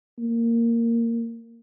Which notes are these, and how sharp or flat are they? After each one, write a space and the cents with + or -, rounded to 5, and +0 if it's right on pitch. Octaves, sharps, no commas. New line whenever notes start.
A#3 -10